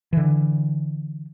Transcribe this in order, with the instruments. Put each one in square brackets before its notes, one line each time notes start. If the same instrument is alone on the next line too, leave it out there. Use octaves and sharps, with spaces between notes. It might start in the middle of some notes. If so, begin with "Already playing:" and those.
[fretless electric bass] D3 E3